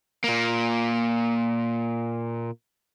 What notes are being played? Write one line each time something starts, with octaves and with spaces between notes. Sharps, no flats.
A#2 A#3